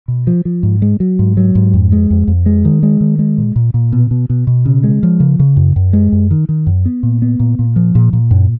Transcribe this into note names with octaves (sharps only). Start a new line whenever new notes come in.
B2
F3
F3
G#2
G#3
F#3
G#2
F#3
G#2
F2
G#3
F2
F2
G#3
D#3
G#3
D#3
G#3
A#2
A#2
A#2
B2
B2
B2
B2
C#3
G#3
F3
C#3
C#3
F#2
F#2
G#3
F#2
D#3
D#3
F#2
B3
A#2
B3
A#2
A#2
F3
A#2
A#2
F#2